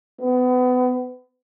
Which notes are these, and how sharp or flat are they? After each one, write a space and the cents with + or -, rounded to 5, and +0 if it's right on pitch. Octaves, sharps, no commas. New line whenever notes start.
B3 +30